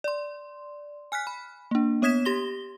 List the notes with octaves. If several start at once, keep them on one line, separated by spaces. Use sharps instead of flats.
D5 C6
G#5 F6 F#6 B6
B5
A#3 D4
B3 C#5 D#6 G#6 B6 E7
G4 C6 A#6 G7